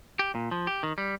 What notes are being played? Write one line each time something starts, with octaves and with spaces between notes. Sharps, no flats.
G4
A#2
F3
G4
D#3
G3